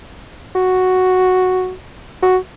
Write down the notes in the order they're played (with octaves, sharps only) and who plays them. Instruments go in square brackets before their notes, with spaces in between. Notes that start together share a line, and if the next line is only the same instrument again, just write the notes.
[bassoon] F#4
F#4